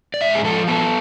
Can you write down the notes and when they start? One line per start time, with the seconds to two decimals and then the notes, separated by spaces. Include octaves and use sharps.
0.14 D5
0.21 G#2 E5
0.35 G#4
0.44 F3 A4
0.68 B3 A4